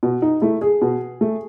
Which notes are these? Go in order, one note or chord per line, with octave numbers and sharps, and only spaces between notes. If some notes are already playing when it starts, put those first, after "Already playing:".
B2
D#4
A3 E4
G#4
B2
A3